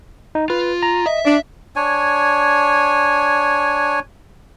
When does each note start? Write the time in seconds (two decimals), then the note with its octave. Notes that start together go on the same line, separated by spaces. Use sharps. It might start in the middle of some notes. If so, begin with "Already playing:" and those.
0.35 D#4
0.50 F4 B4
0.83 A#5
1.06 D#5 E5
1.25 D4 D5
1.76 D4 C#5 G#5